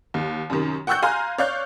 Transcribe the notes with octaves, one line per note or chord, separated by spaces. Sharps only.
D#2
F#2 C3 D#3
F#5 G5 C#6 E6 F#6 G6
F5 G#5 A#5 C6 F6
C#5 D5 F5 C#6 F#6 G6